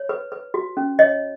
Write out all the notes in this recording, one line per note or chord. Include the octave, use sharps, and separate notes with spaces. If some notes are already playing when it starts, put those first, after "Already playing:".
Already playing: C#5
B4
B4
F#4
C#4
C#5 D#5